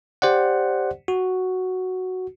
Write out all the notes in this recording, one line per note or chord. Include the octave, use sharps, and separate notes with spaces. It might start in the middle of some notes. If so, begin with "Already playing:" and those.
G4 C5 D5 F#5
F#4